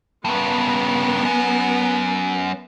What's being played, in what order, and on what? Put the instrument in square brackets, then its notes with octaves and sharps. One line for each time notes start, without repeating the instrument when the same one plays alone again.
[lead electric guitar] G2 C#3 [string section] B3 A#4
[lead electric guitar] F#2